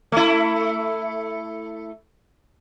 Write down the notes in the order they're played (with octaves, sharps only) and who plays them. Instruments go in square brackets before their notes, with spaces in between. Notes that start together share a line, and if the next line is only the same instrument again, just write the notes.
[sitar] A3 E4